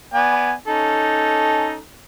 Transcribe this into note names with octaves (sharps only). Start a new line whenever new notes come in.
B3 D5 G#5
C#4 D#4 A4